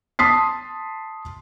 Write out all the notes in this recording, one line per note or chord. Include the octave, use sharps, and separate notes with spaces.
A5 C6 D#6 B6 C7